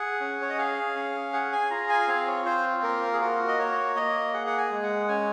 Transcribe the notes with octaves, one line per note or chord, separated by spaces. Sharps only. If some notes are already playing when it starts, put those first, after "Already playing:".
Already playing: G#4 F#5
C#4
C#5
D#5
G#4 F5
C#4
G#4 F#5
G#5
F4 A#5
G#5
C4 F5
C#5
F4 C5
A#3 A#4
G#4
F#4 A#4
D#5
A#3 C#5
A#3 D#5
G#4 F#5
F#5
G#5
G#3
F#5
C#4 G#5